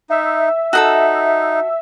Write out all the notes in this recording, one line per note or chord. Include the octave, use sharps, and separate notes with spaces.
D#4 E5
D#4 F#4 G#4 A4